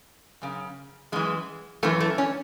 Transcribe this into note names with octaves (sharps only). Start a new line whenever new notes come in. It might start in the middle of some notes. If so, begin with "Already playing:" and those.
F#2 C#3
F#2 E3 G#3
F#2 E3 A3
A3
C#4